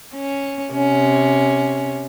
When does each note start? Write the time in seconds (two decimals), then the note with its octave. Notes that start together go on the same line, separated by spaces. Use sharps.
0.15 C#4
0.72 C3 C#4